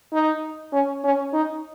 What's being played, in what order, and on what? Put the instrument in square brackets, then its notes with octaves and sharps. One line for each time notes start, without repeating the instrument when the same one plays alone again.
[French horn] D#4
C#4
C#4
D#4